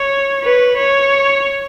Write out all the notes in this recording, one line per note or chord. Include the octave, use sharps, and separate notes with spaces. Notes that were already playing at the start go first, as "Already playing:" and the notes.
Already playing: C#5
B4
C#5